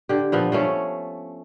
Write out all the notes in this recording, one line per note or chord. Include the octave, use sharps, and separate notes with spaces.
D3 G4
A#2 F3 B3
F3 A3 C#4 C#5